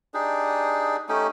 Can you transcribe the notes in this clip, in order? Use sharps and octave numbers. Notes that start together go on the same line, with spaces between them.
D4 D#4 G4 G#4
A3 C#4 D#4 G4